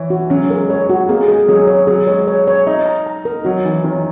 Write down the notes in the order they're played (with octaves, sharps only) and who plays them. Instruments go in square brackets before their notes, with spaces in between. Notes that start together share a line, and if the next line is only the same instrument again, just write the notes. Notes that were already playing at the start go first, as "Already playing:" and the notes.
Already playing: [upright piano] E3 [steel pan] C#5
[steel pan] F#4
[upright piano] F#3 [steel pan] C#4
[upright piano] G#3 [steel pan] A#4
[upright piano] G#3 [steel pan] C#5
[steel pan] F#4
[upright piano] A#3 [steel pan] G#4
[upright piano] G#3
[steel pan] G#4
[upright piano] G#3
[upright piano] F#3 [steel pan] G#4
[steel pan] C#5
[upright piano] F#3 [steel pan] G#4
[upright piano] G#3 [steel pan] C#5
[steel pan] C#5
C#5
[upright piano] D#4 [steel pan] E5
[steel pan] A#5
A#5
A#4
[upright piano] F#3 [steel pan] F#4
[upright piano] E3 [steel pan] D#4
[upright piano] D#3 [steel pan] C#5